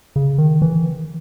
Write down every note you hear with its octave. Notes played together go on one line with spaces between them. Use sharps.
C#3
D#3
E3